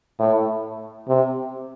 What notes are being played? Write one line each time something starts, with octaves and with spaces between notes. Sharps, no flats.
A2
C3